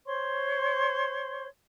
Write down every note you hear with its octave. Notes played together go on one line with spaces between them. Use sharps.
C5 C#5 C6 C#6